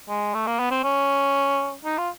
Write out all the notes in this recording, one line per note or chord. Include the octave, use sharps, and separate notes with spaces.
G#3
A3
A#3
B3
C4
C#4
D#4
F4